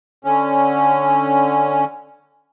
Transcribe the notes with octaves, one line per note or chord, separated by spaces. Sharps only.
D3 C#4